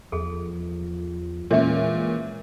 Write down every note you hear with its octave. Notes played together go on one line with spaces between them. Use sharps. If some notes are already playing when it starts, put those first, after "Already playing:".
E2 F3 G#4 A4
A#2 E3 G#3 C#4 C#5 E5